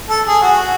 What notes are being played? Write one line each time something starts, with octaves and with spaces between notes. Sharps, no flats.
A4
G#4
F#4